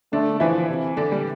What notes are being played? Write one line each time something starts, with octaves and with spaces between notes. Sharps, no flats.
D3 A3 D4
E3 F3 E4
C3
D3 D4
G3